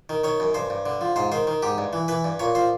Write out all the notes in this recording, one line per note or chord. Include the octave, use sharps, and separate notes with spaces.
D#3
D#3 C#5
F#2
G2 C5
G2
D3
F3
G#2 C5
D#3 C5
D#3
G#2 G4
G2
E3
E3 B4
G2
A#2 C#5
F3 C5